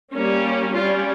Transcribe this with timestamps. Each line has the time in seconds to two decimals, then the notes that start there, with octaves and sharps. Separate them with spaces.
0.14 G3 A#3 C#4
0.74 G3 C#4 F4